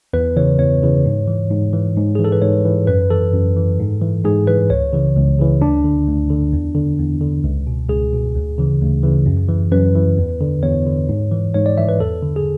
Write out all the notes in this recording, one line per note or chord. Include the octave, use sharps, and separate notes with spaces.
E2 B4
C#3 E3 C#5
E2 C#5
C#3 E3
G#2
E3
G#2
E3
G#2
E3 G#4
A4
B4
G#2 C#5
E3
F#2 B4
E3 A4
F#2
E3
G#2
E3
G#2 G#4
E3 B4
C#2 C#5
C#3 E3
C#2
C#3 E3
D2 D4
D3
D2
D3
E2
D3
E2
D3
C#2
B2
C#2 G#4
B2
D2
C#3 E3
D2
C#3 E3
F#2
E3
F#2 B4
E3
E2
D3
E2 C#5
D3
G#2
E3
G#2 C#5
D5
E3 E5
B4
E2 A4
D3
G#4